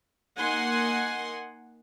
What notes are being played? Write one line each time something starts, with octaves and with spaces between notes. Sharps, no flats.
A#3 D#4 F#5 G#5 C6